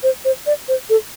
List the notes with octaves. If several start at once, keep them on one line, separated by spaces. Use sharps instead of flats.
C5
C5
D5
C5
A4